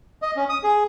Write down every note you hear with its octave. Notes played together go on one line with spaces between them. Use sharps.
D#5
C#4
D#6
G#4